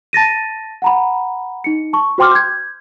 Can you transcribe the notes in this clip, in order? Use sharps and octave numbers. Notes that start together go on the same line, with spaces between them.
A5 A6 A#6 D#7
F#5 A#5 B5
D#4 C#7
A5 C#6
F#4 C5 G5 C6 D6 F6
G6 G#6